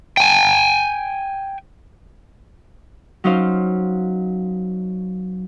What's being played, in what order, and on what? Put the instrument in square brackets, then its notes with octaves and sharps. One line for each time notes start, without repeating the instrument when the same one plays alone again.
[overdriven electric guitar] G5 G#5
[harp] F#3 C#4 D#4 C5 F5